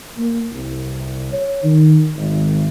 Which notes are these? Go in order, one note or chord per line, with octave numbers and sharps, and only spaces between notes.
A#3
C2
C#5
D#3
G#1